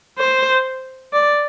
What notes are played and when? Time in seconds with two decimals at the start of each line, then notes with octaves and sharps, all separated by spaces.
0.18 C5
1.13 D5